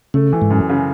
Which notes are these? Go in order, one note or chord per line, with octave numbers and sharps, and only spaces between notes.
C#3 A3
E3
G#2
F#2
C#3